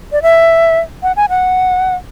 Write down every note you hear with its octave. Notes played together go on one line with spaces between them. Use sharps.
D5
E5
F#5
G#5
F#5